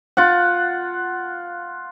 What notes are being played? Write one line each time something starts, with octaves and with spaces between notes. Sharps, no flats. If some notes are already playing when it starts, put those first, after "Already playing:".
F4 F#5